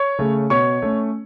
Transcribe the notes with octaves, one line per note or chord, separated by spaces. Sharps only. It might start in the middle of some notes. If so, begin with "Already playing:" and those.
Already playing: C#5 C#6
C#3 A3 C#4
B2 C#5 C#6
A3 C#4